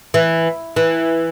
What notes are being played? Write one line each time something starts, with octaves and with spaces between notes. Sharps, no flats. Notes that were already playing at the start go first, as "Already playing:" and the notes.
E3
E3